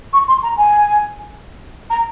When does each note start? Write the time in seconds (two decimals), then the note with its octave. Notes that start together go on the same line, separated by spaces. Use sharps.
0.13 C#6
0.27 C6
0.42 A#5
0.57 G#5
1.89 A#5